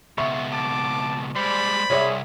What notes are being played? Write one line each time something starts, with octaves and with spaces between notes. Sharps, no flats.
C#2 B2 E5 C#6
E3 A5 D6
G3 G#3 C5 D5 B5
C2 G#4 C#5 D5 E5